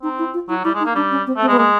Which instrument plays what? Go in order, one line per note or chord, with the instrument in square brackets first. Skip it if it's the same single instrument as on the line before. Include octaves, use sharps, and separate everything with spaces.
[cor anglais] C4 [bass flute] D#4
[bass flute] E4
F4
[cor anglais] F#3 [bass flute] E4
[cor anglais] G3 [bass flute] E4
[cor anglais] G#3
[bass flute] D#4
[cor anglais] A#3
[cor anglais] G3 [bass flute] D4
[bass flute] C#4
C4
[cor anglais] A3
[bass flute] C4
[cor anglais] G#3
[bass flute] B3
[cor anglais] G#3 [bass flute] A#3